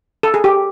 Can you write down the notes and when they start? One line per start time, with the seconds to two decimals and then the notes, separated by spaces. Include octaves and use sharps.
0.23 A4
0.34 G#4
0.44 G4